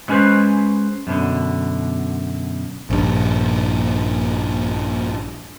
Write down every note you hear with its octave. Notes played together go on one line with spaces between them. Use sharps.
F#3 G#3 C#4 G#4 B4 C5
F#2 B2 D3
A#1 G2